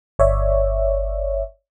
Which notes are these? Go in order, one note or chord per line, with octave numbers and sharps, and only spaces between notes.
G1 C#5 D5 E5